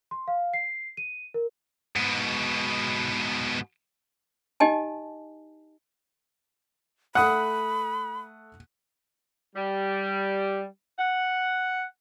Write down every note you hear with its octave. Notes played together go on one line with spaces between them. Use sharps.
C6
F5
C7
D#7
A#4
G#2 B2
D#4 G4 D#5 G#5 A5
A3 F#5 B5 D#6 F#6
G3
F#5